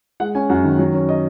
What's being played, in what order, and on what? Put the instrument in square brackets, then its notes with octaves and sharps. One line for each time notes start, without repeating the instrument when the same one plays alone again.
[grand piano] G#3 F#5
C#4 G#5
F#2 F#5
D#3
F#3
C#4
D#5